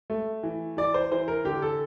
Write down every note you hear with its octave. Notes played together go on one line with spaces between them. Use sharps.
A3
E3
E3 D5
C5
E3 C5
A#4
D3 G4
A4